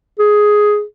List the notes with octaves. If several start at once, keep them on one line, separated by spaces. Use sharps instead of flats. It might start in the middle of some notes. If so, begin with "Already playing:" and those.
G#4